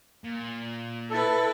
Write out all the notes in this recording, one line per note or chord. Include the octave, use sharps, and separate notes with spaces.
A#2
E4 A4 B4